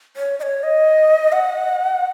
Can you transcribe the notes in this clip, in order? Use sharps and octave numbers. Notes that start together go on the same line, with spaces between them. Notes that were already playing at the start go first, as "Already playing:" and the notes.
C#5
D#5
C#5
D#5
F#5